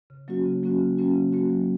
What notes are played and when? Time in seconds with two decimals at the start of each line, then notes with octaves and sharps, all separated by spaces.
0.10 C#3
0.28 F#3 A#3 C#4 F#4
0.46 C#3
0.63 F#3 A#3 C#4 F#4
0.80 C#3
0.97 F#3 A#3 C#4 F#4
1.15 C#3
1.33 F#3 A#3 C#4 F#4
1.50 F#3